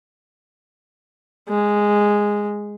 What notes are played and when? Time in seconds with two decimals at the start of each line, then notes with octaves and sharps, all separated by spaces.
1.49 G#3